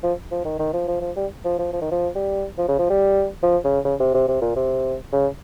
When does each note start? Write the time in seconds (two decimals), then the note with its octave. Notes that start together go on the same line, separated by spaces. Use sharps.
0.03 F3
0.31 F3
0.45 D#3
0.59 D#3
0.73 F3
0.88 F3
1.01 F3
1.17 G3
1.45 F3
1.59 F3
1.73 F3
1.81 D#3
1.91 F3
2.15 G3
2.58 F3
2.68 C#3
2.78 F3
2.90 G3
3.43 F3
3.65 C#3
3.85 C#3
4.00 C3
4.14 C3
4.28 C3
4.42 A#2
4.56 C3
5.12 C#3